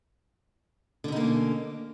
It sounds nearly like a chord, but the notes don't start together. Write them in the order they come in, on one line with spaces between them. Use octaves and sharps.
D3 B2 D#4 A#3 C#4